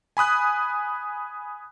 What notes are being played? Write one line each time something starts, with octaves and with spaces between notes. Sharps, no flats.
G#5 B5 D#6 F#6